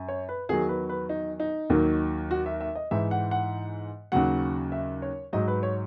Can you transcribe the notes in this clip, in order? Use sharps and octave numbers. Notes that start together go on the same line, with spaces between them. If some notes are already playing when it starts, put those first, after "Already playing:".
Already playing: F#2
C#5
B4
E2 D#3 F#3 G#4
B4
B4
D#4
D#4
D#2 D#3 F#3
F#4
E5
E5
D#5
G#2 E3 E5
F#5
F#5
D#2 C#3 F#3 F#5
E5
C#5
G#2 F#3 D#5
B4
C#5